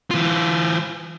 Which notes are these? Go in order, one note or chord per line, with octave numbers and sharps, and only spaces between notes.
E3 F4